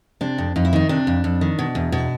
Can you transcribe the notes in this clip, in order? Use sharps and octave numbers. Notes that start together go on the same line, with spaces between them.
C3 D4
F2
F2 D#4
E4
D#3 D#4
C3 D4
F2
F2
D#3
B2
E2
B2